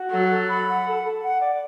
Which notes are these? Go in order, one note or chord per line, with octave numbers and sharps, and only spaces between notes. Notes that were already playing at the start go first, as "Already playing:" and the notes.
Already playing: F#4
F#3 A4
A4
B5
F#5
A4
A4
F#5
D5